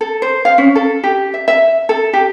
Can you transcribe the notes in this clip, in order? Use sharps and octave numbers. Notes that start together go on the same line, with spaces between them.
A4
C5
F5
C#4
A4
G4
E5
E5
A4
G4